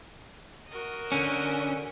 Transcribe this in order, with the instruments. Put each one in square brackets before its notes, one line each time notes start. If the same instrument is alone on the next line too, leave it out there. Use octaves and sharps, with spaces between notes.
[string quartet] F#4 A#4 D#5
[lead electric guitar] D3 C#4